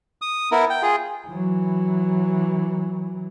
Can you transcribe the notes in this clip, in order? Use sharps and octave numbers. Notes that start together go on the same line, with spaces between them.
D#6
B3 E4 A#4
G5
F4 G#4
E3 F#3